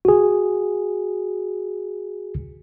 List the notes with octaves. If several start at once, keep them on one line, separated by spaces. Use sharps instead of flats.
F#4 G#4